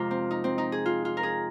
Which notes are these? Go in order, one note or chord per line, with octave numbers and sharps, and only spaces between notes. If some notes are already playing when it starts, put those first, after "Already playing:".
Already playing: F2 C3 G#3 F4 A#4
C4
D#4
C4
D#4
G#4
F4
F4
A#4
G#4